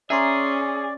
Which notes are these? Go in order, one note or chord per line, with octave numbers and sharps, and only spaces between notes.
C#4 G#4 D5 E5 A#5 C6